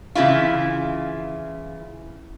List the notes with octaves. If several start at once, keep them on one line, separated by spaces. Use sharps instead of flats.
C#3 E3 E4 F4